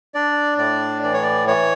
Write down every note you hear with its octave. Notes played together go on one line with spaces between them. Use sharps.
D4 D5
A2 D5
E3 D5
C#5
D5
E3 C#5